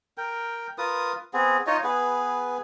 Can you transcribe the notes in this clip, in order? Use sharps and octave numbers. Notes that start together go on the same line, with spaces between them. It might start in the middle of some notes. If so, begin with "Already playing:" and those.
A#4 G5
F4 A#4 B4 D#6
B3 C4 G#4
D#4 F4 C#5 D#5
B3 G#4 B4